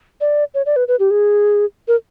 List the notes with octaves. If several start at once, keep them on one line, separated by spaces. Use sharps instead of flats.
D5
C#5
D5
B4
B4
G4
G#4
A#4